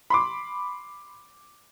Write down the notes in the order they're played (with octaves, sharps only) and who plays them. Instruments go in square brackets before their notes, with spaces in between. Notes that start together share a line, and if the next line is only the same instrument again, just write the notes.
[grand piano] B5 C6 D6